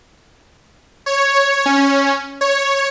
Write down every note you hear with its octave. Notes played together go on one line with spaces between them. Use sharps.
C#5
C#4
C#5